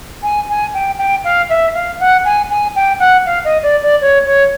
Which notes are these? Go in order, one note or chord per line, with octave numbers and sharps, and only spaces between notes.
G#5
G#5
G5
G5
F5
E5
F5
F#5
G#5
G#5
G5
F#5
F5
D#5
D5
D5
C#5
C#5